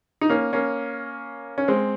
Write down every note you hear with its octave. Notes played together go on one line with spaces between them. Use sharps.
D#4
A#3 C#4
A#3 C#4
C#4
G#3 C4